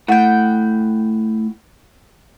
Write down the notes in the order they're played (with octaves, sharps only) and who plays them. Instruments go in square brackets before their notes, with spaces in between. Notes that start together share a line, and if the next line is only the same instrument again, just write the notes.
[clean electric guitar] A2 [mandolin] F#5 G5